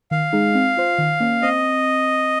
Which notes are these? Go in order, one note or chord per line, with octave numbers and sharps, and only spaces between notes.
D#3 F5
G#3 D#4 G#4
C4
F4 C5
D#3
A#3 C#4
C4 D#5